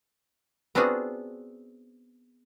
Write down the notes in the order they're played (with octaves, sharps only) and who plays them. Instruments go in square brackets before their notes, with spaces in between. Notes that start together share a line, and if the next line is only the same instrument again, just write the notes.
[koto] B3 C4 D4 F4 F#4 G#4